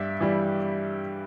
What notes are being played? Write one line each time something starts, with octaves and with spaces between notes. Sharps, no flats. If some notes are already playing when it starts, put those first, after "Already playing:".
Already playing: G2 D5 E5
E3 G3